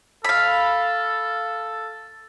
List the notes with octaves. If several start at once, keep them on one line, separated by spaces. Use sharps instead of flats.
A4 F5 B5